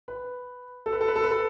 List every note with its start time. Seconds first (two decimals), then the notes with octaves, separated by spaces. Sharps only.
0.08 B4
0.86 A4
0.93 B4
1.01 A4
1.08 B4
1.16 A4
1.24 B4
1.31 A4